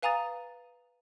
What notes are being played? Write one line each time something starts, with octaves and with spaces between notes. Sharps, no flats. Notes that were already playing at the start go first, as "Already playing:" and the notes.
B4 F5 G#5 A#5 D#6 A6